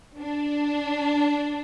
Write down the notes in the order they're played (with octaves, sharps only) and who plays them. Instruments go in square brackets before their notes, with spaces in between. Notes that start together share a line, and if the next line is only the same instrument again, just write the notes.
[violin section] D4